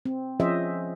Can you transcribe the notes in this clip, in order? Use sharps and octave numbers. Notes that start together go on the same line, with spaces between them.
C4
F3 C#4 G#4 C5 D#5 E5